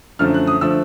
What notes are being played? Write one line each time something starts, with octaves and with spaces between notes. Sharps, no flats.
F#2 D3 F3 A3 F6
F#6
D#6
D3 F3 A3 E6